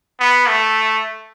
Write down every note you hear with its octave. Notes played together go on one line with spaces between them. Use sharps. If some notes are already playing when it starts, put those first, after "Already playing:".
B3
A3